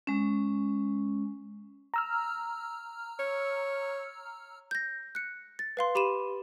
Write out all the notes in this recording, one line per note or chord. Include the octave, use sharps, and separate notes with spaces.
G#3 C#4
A#5 E6 F6
C#5
G6 A#6
F#6 C#7
A6
B4 F5 C6
G4 B5 D#7 E7